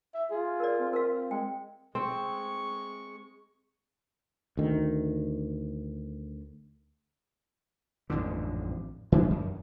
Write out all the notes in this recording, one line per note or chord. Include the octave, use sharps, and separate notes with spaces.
E5
F4 G#4
A#4 D5
C4
A#4 F5
G#3 G5
G#3 C4 C#6
D2 D#3
A1 F2 G#2 D3
D#3 G#3 C#4 D4
F#2